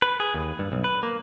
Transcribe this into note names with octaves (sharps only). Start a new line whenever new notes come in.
B4
G#4
D#2
G2
B1
B4
A#3